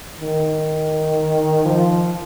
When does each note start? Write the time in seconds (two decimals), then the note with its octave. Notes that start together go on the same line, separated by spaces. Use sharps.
0.21 D#3
1.65 F3